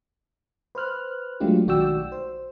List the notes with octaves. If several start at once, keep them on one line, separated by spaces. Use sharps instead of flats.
B4 C5 F6 F#6
F#3 G#3 A3 D4 F4 G4
B1 D#3 F#4 D5 G5 E6
C5